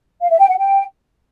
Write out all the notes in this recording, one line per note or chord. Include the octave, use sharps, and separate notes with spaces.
F5
E5
G5
F#5
G5